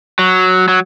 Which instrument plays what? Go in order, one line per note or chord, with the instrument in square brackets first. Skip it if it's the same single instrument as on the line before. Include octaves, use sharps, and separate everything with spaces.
[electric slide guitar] F#3
F#3